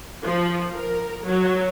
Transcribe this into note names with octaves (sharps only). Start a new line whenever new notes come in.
F3
A#4
F#3